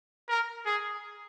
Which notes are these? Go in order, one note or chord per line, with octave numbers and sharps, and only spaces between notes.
A#4
G#4